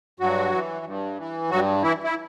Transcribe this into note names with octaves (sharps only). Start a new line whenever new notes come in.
G2 F#3 F#4
E3
G2
E3
G2 F#3 F#4
E3 E4
E4